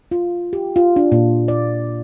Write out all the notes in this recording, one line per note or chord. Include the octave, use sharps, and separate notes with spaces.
F4
G4
F4
D4
A#2
D5